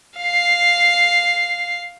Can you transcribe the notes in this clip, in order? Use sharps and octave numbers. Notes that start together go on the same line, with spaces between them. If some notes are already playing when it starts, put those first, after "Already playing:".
F5 C7